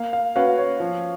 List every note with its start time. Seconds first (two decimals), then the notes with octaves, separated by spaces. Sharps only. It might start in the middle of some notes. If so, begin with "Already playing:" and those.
Already playing: A#3 F5
0.13 F5
0.36 C#4 F#4 B4 F5
0.58 C#5
0.80 F3